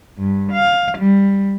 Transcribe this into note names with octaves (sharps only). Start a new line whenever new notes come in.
G2
F5
G3